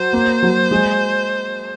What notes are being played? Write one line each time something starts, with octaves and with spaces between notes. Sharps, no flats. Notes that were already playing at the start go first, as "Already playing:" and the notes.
Already playing: F#3 C5
A#3
F#3
G#3